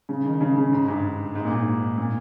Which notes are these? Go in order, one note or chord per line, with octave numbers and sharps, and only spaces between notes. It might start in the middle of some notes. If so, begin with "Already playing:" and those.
C#3
D#3
C#3
C#3
G#2
G2
G#2
A#2
G#2
A#2